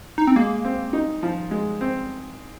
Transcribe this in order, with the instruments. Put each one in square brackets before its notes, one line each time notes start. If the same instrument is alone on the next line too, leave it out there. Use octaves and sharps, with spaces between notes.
[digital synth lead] D#4
C4
[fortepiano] G#3 [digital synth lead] A#3
[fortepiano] C4
D#4
F3
G#3
C4